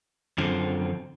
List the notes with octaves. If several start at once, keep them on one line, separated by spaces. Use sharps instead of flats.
F#2 D3 F3 C4